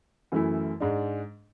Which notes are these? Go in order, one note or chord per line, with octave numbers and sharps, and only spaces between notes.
F#2 E3 A3 E4
G#2 G#3 D4